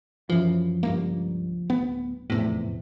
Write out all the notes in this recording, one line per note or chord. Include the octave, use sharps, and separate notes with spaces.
F#2 E3 F3
C#2 G2 A#3
D1 B3
F1 E2 A2 C3